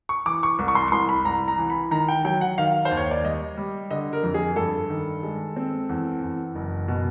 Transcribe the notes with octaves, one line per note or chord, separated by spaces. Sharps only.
C#6
E3 D6
C#6
C2
C#6
C6
C#6
C2 C6
B5
C2 A#5
A#5
E3
B5
D#3 A#5
G5
F#3 G5
F#5
D#3 F5
C5
D#2
C#5
D5
G3 D#5
G3
D3 D#5
A#4
F2
G#4
G2 A4
D#3
G#3
C4
E2
E2
F#1
B2